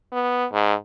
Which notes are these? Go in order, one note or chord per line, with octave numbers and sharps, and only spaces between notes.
B3
G#2